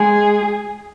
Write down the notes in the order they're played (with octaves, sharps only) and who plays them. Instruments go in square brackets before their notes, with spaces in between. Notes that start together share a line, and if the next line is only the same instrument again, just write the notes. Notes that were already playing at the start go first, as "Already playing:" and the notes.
Already playing: [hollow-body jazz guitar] G#3 [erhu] G#4